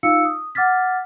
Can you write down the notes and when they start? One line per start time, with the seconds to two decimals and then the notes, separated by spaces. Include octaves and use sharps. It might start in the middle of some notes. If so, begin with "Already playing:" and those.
0.03 D#4 F4 F5 E6 C#7
0.25 D#6
0.55 F#5 D6 F6 A6 B6